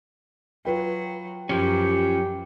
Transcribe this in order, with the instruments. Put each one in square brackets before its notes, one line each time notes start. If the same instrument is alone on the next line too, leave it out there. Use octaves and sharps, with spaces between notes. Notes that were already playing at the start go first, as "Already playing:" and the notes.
[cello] F#3 [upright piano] F4 B4 G5
[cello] F#2 F#3 [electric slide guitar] F3 C#4 [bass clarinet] G4